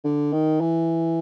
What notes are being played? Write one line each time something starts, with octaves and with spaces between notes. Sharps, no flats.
D3
D#3
E3